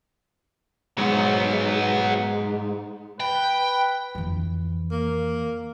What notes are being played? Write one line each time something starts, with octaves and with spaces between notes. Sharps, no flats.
G#2 F#3 B3
B4 G5
F2 E3
A#3